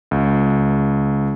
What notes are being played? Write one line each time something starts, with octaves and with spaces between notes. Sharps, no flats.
C#2